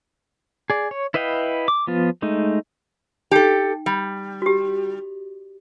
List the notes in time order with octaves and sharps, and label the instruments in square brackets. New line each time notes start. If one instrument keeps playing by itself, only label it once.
[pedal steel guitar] G#4 D5
C#5
E4 B4 D#5 F5 G5
D6
F3 B3 F4
G#3 A3 D#4
[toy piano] D#4 G5 [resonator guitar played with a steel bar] G4 A4
[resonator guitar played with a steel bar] G3
[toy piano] F#4 G4